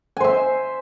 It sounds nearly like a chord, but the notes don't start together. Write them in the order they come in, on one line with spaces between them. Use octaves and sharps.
G#5 C5 E5